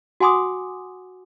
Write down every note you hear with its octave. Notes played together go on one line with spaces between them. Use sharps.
F#4 F#5 G#5 C6 D6 D#6